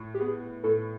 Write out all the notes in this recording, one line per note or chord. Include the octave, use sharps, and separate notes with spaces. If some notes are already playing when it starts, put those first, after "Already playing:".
Already playing: A2
G4
B3 G#4
A2 A4